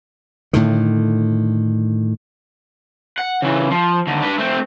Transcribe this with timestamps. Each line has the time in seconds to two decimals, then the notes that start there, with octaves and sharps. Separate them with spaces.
0.53 A2 D3 D#3
3.18 F#5
3.42 C#3 E3
3.71 F3
4.07 D#2 D3
4.22 D4 B4
4.39 A3 C4